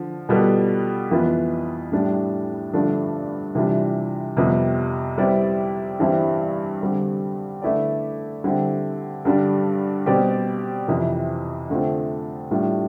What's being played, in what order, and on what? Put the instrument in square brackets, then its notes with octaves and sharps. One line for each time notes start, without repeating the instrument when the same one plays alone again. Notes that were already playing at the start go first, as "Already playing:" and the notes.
Already playing: [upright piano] D3 F3
B2 G3 B3 F4 A4
F2 E3 B3 F4 B4
A2 G3 D4
G2 D3 F3 A3 D4
C3 E3 G3 D4 F4
F2 C3 G3 B3
G3 C4 E4 B4 D5
G2 E3 G3 C4 E4
D3 G3 C4
D3 A3 E4 B4 D5
D3 G3 C4 E4
G2 D3 G3 D4
B2 G3 C4 G4 D5
F2 C3 E3
D3 A3 C4 F4
A2 G3 D4 F4